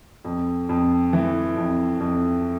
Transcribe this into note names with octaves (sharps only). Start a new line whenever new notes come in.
F2
F2
E3
F2
F2